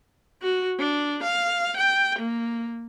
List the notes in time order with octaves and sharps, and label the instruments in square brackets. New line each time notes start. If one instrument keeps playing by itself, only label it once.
[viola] F#4
D4
F5
G5
A#3